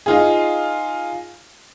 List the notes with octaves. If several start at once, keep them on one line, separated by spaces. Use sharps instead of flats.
D#4 F4 G#4